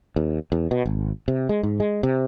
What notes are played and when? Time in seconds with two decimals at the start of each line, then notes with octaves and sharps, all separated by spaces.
0.16 D#2
0.52 E2
0.71 B2
0.86 G#1
1.28 C3
1.49 G#3
1.63 G#2
1.80 G#3
2.03 C3